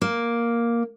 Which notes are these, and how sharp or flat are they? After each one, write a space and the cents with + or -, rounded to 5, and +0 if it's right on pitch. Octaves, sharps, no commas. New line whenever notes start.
A#3 +5